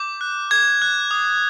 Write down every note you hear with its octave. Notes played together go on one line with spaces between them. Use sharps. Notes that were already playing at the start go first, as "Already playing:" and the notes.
Already playing: D6 G6
F#6
D6 G#6
F#6
D#6